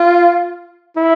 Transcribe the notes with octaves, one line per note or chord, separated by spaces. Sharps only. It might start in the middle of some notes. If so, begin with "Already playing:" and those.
Already playing: F4
E4